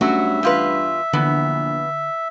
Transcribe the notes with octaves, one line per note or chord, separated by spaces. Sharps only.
G2 F#3 A3 C#4 F#4 E5
E2 F4 B4
A#1 D3 E3 B3